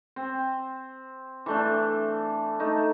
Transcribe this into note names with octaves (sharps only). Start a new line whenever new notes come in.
C4
E3 A3 D4
A3 D#4